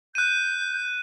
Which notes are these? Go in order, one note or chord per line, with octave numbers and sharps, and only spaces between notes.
F#6 G6 D#7